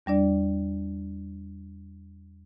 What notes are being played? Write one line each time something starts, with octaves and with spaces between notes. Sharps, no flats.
E2 G3 D4 D5